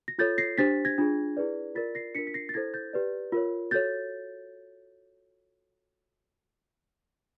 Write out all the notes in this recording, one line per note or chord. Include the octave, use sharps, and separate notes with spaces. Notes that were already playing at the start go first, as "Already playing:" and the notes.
A#6
F4 A4 C#5 G6 A6
A#6 C7
D4 G4 C5 A6 B6
G#6 A#6
D4 F4 G#4
E4 G#4 B4 D5
F4 A#4 D5 A6 B6
A#6 C7
D4 F4 A#4 B6 C#7
B6
A#6 C7
A6
E4 A4 C5 G#6 A#6
G6 A6
G4 B4 D5
F4 A#4 C#5
F#4 A4 C#5 G6 A6